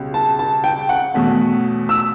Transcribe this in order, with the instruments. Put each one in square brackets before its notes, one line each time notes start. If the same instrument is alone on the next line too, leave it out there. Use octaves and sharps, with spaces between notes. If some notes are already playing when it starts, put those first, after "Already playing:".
Already playing: [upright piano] C#2 B2 G3 C#4
A5
A5
G5
F#5
E2 B2 A3 C#4
E6